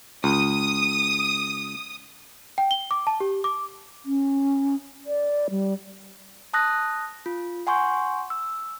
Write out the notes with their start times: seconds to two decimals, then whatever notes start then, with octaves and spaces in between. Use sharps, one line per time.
0.24 C#2 D#6
2.58 G5
2.71 G7
2.91 D6
3.07 A5
3.20 G4
3.44 D6
4.05 C#4
5.06 D5
5.50 G3
6.53 A5 D#6 F#6 A#6
7.26 F4
7.67 F#5 G#5 C6 C#6 G6
8.30 E6